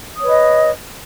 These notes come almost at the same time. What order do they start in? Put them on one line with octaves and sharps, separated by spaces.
D#6 C#5 B4 D#5